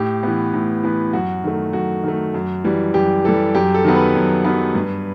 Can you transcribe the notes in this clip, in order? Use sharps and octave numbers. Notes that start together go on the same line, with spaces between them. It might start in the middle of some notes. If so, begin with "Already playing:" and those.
Already playing: A2 G4
E3 B3
A2
E3 B3
F#2 F#4
D#3 A3
F#2 F#4
D#3 A3
F#2
E3 G3
F#2 G4
E3 G3 A4
F#2 G4
A4
D#3 F#3 B3
B4
F#2
D#3 F#3 B3
G2